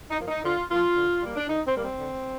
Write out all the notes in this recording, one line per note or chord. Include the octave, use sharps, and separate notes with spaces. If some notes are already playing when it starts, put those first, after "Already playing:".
D#4
F3 A#3
D#4
D3 F4
F3 A#3 F4
D3
G3 A#3
D4
D3 D#4
C4
G3 A#3
C4
D3